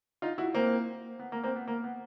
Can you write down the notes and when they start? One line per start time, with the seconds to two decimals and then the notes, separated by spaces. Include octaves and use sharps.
0.22 D#4 F4
0.38 E4 F#4
0.54 A#3 C4
1.19 B3
1.32 A#3
1.43 A#3 C4
1.56 B3
1.68 A#3
1.84 B3